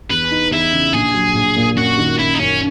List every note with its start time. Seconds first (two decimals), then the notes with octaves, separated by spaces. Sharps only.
0.10 E2 B4
0.31 D#4
0.52 E2 E4
0.73 C#3
0.93 A#1 G#4
1.14 F#3
1.35 A#1
1.57 A#2
1.77 F#2 F#4
1.97 D#3
2.19 F#2 E4
2.34 D#4
2.39 F#2 C#4